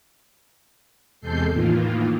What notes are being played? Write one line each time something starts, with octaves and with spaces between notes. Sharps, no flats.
E2 C3 G#3 A4 G6 C7
A2 D#3 E3 A#3 F4